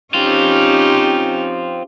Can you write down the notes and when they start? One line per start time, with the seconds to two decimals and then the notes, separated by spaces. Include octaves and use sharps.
0.14 C4 C#4 D#4 F4 G4